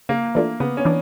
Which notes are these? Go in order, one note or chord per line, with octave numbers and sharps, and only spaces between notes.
C#3 A#3
E3 A3 D4 F4
C#3 B3
C#4
E3 D4